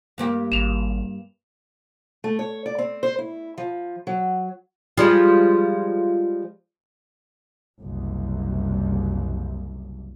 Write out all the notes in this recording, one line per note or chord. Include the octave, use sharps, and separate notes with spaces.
G2 A#3 G4
G#1 E7 F7
A3
C#5
D5
C4
C5
E4
F3
F#3
F3 G3 G#3
F#1 C2